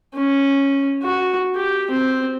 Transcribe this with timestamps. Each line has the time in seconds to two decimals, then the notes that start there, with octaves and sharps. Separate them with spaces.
0.15 C#4
1.03 F#4
1.55 G4
1.90 C4